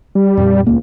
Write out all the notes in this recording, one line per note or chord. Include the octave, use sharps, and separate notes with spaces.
G3
F2 A#2
D#1 C#2 A#3